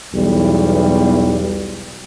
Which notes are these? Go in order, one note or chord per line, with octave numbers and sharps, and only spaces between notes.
B1 E2 E3 G3